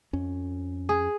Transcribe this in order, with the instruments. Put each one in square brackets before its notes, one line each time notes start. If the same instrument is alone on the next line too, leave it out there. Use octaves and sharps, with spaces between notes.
[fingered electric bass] F2 C#4
[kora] G#4